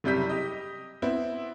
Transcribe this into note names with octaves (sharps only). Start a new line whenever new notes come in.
F#1 C3 G3 G6 B6
G4 D#5
B3 C4 E4